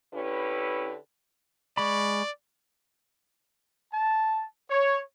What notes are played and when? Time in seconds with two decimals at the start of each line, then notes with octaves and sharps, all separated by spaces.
0.14 D3 C#4 E4 G4 B4
1.77 G#3 D5 B5 C#6
3.93 A5
4.70 C#5